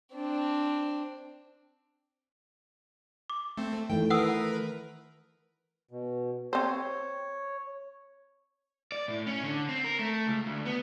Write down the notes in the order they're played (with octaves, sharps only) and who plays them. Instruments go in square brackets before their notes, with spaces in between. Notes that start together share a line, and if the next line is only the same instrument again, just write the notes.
[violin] C4 D4
[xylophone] D6
[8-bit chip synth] A3 C4
[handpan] D#3 E3 A3 [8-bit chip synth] G5
[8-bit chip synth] A#4 B4 [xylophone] F#5 D#6 E6
[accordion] B2
[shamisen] C4 C5 [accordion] C#5
[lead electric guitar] D5
A2
C#4
D3
C4
A#4
A3
C#2
D2
B3